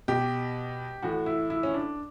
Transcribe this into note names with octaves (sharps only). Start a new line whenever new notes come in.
B2 G4
A2 E3 F#4
E4
E4
C#4
D4